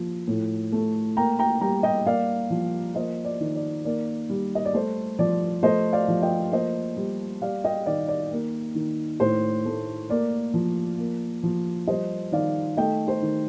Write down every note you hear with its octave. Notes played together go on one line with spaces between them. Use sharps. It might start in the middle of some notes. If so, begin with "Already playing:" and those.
Already playing: F3 A#3
A2
A3
A#3 G5 A#5
G5 A#5
G3 G5 A#5
D#5 G5
A#3 D5 F5
F3
A#3 C5 D#5
D5
D#3
D5
A#3 D5
G3
D#5
D5
A3 C5
F3 D5
A3 C5 D#5
D5 F5
F3
D#5 G5
A#3 C5 D#5
G3
G3 D5 F5
D#5 G5
D#3 D5 F5
D5
A#3
D#3
A2 C5
A3
A#3 D5
F3
A#3
F3
G3 C5 D#5
D#3 D5 F5
A3 D#5 G5
C5
D#3